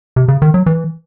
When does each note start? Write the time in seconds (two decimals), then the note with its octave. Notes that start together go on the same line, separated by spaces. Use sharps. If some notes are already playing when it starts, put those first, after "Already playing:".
0.16 C3
0.28 C#3
0.42 D#3
0.54 F#3
0.66 E3